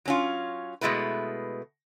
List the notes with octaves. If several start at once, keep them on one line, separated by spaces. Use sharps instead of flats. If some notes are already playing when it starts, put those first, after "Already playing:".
F#3 C#4 F4
B2 G#3 A3 E4 B4